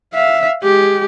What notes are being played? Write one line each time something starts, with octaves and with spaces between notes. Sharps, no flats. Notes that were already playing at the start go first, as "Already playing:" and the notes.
E5 F5
G#3 G4